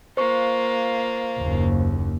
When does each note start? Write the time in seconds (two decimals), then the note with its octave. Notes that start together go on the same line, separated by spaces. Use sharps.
0.17 A#3 F4 C5 C#6
1.39 F#1 D#2